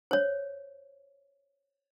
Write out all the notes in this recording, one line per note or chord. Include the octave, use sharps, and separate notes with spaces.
C5 C#5